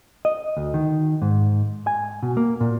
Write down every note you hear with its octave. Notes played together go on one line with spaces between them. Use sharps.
D#5
D2
D#3
G#2
G#5
B2
A#3
A#2